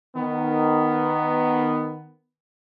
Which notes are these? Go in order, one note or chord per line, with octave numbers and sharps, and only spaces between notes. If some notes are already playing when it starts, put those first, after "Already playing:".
D#3 B3